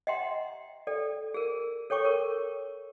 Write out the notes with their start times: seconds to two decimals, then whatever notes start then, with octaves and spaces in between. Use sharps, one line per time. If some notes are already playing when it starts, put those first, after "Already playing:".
0.07 D#5 E5 F#5 G5 A#5 C6
0.87 A4 D5 G5
1.34 G#4 A#4
1.90 A4 C#5 G5 C#6 D6
2.05 A#4